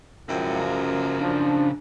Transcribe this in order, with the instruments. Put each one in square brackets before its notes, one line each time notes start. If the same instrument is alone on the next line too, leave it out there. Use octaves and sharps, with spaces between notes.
[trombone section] C#2 F3 [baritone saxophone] F#2 [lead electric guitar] E4 G5
[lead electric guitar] C#3 A#4
[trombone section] A1 F3 [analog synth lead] D4